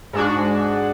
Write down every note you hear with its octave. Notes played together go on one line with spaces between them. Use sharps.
G#2 G#3 D4 F#4